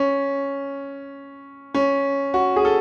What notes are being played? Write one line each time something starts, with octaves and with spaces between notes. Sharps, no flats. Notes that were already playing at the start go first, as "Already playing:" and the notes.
Already playing: C#4
C#4
F#4
G#4
A4